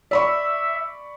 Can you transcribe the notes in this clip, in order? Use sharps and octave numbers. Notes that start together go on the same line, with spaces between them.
D5 E5 B5 C#6